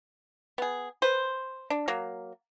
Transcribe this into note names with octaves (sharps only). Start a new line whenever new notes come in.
B3 G#4
B4 C5
D4
F#3 A#3